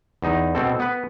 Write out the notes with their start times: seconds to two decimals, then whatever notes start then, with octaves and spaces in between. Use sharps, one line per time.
0.22 E2 D#4
0.55 B2 C4 A4
0.80 B3 B4